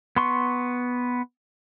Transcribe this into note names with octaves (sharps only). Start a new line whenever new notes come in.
B3 C6 C#6